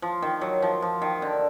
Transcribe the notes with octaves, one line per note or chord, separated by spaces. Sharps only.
F3
D#3
F#3
F3
F3
D#3
D3